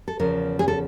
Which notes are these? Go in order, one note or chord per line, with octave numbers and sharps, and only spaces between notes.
A4
E2 C#3 F3 A#4
G#4
A4